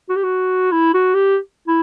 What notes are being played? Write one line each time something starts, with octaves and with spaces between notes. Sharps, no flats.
F#4
G4
F#4
E4
F#4
G4
E4